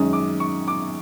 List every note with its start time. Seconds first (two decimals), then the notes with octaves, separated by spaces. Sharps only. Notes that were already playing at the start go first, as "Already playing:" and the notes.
Already playing: F#2 D#3 G#3 C#4 D#6
0.13 D6
0.40 C#6
0.68 D6